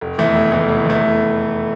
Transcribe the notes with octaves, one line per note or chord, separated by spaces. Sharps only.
F1
E2 E3 A3
F1
E2 E3 A3
F1
E2 E3 A3
F1